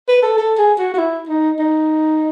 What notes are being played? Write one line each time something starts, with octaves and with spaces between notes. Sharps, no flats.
B4
A4
A4
G#4
F#4
F#4
E4
D#4
D#4